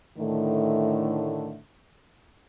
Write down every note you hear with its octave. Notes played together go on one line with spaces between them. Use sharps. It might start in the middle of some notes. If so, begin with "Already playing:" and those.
A2 D3 D#3 A3